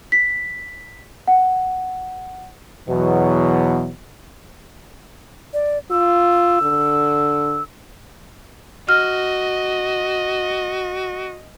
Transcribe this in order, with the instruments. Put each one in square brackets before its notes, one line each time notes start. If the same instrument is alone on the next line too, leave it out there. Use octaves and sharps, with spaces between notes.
[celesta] B6
F#5
[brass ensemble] E2 B2 F#3
[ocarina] D5
[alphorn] F4 [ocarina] E6
[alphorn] D3
[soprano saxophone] F#4 [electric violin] D#5 [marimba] F6